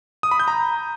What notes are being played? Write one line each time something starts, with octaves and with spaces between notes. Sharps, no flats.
D#6
B5
G6
A#5